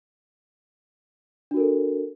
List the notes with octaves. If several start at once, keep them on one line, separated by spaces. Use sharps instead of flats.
D4 F#4 A4 A#4